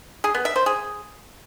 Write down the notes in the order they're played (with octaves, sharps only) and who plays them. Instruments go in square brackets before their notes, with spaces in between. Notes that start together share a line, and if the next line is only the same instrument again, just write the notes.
[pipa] G#4
B3
E5
C5
G#4